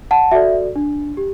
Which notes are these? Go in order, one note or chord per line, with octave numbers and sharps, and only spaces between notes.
F#5 A5
F#4 A4 D5 E5
D4
G4